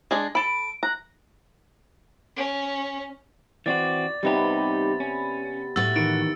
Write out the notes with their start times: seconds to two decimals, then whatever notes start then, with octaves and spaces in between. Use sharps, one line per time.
0.11 G#3 D4 G#4
0.35 A4 B5 D7
0.83 A#5 F#6
2.36 C#4
3.66 E3 C4 F#4 D5 A6
4.23 C3 G3 B3 D#4 G4 B5
5.00 C#4
5.76 A2 F#4 E6 A6
5.96 D#3 E3 C#7 D7